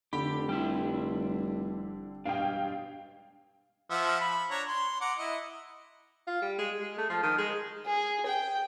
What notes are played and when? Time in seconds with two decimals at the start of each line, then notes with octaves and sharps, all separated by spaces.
0.13 F1 D3 G4 B5
0.49 G3 E4 G4
2.25 G2 G#3 D4 F5 G5
3.90 F3 E5 F#5
4.20 B5
4.50 D4 C#5 A#5
4.68 C6
5.01 F#5 A#5 D6
5.18 E4 D#5
6.27 F4
6.42 G3
6.59 G#3
6.80 G#3
6.98 A3
7.10 F3
7.23 D#3
7.38 G#3
7.86 G#4
8.26 G5